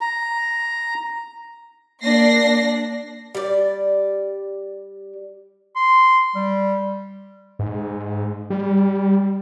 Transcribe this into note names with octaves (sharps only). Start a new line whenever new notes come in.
A#5
A#3 D4 A#6 C7
G3 D5
C6
G3
G#2
G3